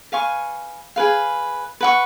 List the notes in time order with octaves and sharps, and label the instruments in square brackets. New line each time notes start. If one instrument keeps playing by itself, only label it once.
[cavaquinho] B4 F5 G#5 C#6
G#4 B4 F5
B4 F#5 C#6